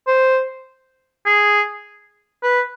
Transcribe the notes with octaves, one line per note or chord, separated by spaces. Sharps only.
C5
G#4
B4